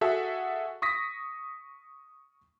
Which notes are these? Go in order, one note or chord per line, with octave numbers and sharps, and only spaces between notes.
F#4 G#4 A4 E5 F#5
C#6 D#6 A#6 B6